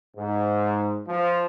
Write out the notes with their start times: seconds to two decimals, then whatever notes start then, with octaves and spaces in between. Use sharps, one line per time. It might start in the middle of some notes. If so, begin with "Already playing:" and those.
0.17 G#2
1.08 F3